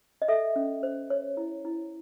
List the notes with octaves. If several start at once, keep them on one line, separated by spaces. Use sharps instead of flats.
D#5
A4 E5
C#4
C5
C#5
E4
E4